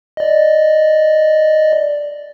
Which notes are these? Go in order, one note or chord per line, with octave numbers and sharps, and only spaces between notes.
D5 D#5